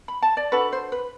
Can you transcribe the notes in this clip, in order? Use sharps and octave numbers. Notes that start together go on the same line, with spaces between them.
B5
A5
D5
D4 F#4 A4 B4
C5
B4